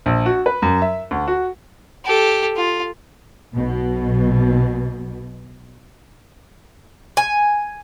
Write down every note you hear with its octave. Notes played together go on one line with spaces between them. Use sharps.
A#1
F#4
B4
F#2
E5
D2
F#4
G4 A4
F4
B1 B2
G#5